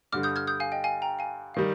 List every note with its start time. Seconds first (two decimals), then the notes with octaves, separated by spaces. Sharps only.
0.12 G2 D3 G3 D6 F6
0.23 D#6 G6
0.36 F6 G#6
0.47 D#6 G6
0.60 F5 G#5
0.72 D#5 G5
0.84 F5 G#5
1.02 G5 A#5
1.19 F5 G#5
1.54 D#3 G3 F5